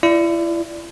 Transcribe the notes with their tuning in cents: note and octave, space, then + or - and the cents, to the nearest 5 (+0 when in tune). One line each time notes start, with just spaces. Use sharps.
E4 +35 D5 +0